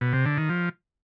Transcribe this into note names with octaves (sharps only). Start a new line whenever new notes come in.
B2
C3
D3
D#3
F3